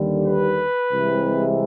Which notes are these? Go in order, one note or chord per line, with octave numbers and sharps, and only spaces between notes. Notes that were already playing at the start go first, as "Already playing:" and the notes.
Already playing: D#2 D3 G3
B4
C2 C3 E3 G#3